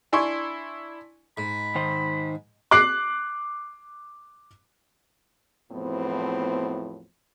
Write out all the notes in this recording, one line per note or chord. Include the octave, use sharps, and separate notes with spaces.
D4 E4 G#5 C6 C#6
G#2 B5
D#3 C5
D6 F#6 C7
E2 A2 F3 F#3 B3 C4